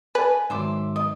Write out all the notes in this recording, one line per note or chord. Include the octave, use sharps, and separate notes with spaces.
B4 D5 G#5
G#2 D#3 F#3 E5 C6 D6
D#5